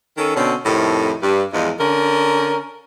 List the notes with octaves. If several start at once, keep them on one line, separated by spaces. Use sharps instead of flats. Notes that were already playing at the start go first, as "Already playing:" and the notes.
D#3 C#4 A4
B2 D3 C4 C#4
F2 A2 C3 D#3
G2
E2 G#2 F3 G#3
D3 C#4 A#4